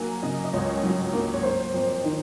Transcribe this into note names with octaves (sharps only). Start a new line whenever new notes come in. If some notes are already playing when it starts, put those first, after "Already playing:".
Already playing: F#3 A#3 G#5 A#5
C#3 D#5
D#5
C#2 C#5
F#3
A#3
C#5
A#3 C5
F2
D#3